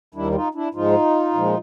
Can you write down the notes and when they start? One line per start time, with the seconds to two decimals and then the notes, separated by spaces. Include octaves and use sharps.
0.15 D#2 D#3 G3 D4 E4
0.34 D#4 F4
0.55 D4 E4
0.74 G#2 F3 G#3 D#4 F4
1.34 A#2 F3 G#3